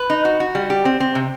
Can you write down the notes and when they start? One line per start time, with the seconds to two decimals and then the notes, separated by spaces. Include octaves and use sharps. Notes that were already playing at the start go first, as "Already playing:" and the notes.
Already playing: B4
0.10 D#4
0.25 F#4
0.40 F#4
0.55 G3
0.70 G4
0.85 C4
1.00 C4
1.15 C3